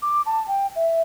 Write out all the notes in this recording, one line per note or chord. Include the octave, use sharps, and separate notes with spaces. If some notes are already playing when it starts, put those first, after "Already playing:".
D6
A5
G5
E5